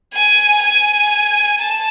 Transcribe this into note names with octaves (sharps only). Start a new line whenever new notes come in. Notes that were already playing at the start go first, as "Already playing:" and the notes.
G#5
G#5
A5